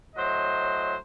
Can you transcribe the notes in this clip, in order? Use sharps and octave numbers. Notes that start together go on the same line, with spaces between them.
A2 F#3 C5 D#5